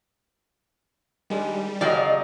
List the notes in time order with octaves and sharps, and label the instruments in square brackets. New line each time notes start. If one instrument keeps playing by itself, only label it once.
[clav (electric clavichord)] D#3 G#3 D4 [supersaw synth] G3
[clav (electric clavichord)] C#3 G4 A5 [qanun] F#3 A#4 F5 [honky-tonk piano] D5 D#5